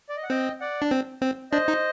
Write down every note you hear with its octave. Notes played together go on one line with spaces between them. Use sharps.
D5
D#5
F#5
C4 D#5 G5
D5 F#5
D4
C4
C4
D4 C5 D#5
D#4